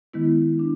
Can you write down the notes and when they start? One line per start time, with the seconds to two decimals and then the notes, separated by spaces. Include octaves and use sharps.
0.13 D#3 G#3 B3 E4
0.59 D4